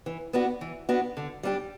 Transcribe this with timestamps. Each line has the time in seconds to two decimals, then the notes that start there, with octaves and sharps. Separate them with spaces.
0.06 E3
0.33 B3 D4 F#4
0.61 E3
0.89 B3 D4 F#4
1.17 D3
1.43 G3 D4 G4